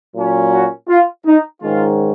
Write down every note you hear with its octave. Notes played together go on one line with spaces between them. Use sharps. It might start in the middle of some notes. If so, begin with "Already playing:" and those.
A#2 F#3 C#4
F#4
F4
D#4
G#2 D#3 G#3 C#4 F4